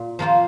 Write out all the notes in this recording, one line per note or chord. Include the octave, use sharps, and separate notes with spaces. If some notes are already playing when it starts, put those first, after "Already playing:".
Already playing: A#2
F3 A#3 F4 C5